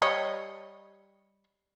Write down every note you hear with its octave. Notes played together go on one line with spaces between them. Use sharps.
G3 C#5 D#5